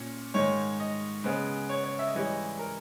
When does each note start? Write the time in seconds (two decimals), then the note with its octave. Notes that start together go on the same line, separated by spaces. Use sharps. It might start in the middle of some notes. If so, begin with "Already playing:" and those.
Already playing: A#2 C#4
0.34 G#2 D#3 G#3 C#5
0.80 D#5
1.24 C#3 G#3 B3
1.69 C#5
1.84 C#5
1.99 E5
2.07 D#5
2.14 G#2 E3 G3 C#5
2.25 D#5
2.59 A#4